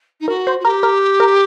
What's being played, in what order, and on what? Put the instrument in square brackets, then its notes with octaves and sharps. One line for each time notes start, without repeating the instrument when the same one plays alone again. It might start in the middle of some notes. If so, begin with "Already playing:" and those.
[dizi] D#4
[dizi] F#4 [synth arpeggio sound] A#4
[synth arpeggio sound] C5
[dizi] F#4
[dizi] G4 [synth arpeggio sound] A#4
[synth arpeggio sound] A#4
A#4